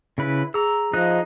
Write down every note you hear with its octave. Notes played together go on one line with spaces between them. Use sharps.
C#3 E4 B4
G#4 A#5 E6
F3 D#4 G#4 D#5 F#6